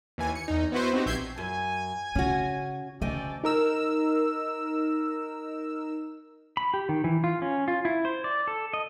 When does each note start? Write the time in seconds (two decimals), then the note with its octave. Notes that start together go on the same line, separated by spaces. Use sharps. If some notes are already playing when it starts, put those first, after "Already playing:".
0.18 D#2 E3 G#5
0.35 C#7
0.48 E2 D#4
0.72 B3 E4 F#4 B4 C5
0.93 C4 D#4 F#4 G4
1.06 A#1 E5 G6 G#6 C7
1.38 F#2 G#5
2.15 C#3 C#4 F#4
3.01 D2 C#3 A4 D5 D#5 G5 G#5
3.44 D#4 A#4 E6
6.57 B5
6.74 G4
6.89 D#3
7.04 E3
7.24 F4
7.42 C#4
7.68 F4
7.85 E4
8.05 C5
8.24 D5
8.48 A4
8.74 D#5